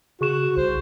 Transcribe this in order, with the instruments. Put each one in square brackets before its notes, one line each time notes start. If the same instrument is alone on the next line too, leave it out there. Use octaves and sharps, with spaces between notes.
[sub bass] C#3 [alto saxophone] F#4 [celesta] G#4 C#6 E7
[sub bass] C2 [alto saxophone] C5